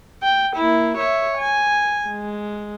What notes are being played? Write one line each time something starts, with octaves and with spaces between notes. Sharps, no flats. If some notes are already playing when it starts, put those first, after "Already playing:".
G5
A#3 E4
C#5 E5
G#5
G#3